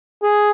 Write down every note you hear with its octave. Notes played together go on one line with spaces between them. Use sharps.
G#4